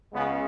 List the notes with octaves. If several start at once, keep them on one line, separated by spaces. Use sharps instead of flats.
C#2 C#3 G#3 B3